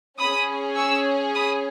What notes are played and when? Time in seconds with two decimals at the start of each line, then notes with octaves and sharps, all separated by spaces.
0.19 C#4 G#4 B5 D#6
0.76 C#6 E6
1.35 B5 D#6